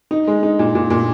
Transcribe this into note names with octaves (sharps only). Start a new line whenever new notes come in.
D#4
G#3
D#4
A#2
A#2
A#2